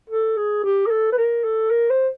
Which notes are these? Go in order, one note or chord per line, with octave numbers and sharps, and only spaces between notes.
A4
G#4
G4
A#4
A4
B4
A#4
A4
A#4
C5